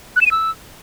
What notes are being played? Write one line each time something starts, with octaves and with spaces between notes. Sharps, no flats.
F#6
E7
D#7
E6